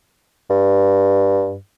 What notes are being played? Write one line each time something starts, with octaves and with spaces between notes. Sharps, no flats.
G2